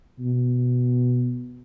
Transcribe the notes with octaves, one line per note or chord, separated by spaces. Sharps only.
B2